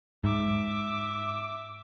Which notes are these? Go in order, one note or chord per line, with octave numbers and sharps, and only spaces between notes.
G#2 E5 D6